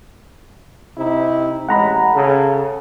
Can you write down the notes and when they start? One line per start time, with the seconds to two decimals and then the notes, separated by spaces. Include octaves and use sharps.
0.98 C3 D#4 E4
1.69 A1 G#3 F#5 A#5 B5
2.14 C#3 A4